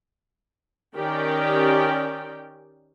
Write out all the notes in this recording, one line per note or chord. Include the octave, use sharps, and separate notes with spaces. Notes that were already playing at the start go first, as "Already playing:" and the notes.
D#3 C#4 G4 A#4 D5 G5